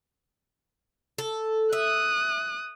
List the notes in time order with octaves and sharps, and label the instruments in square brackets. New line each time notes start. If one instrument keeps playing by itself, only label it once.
[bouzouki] A4
[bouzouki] E5 [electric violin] D#6 F#6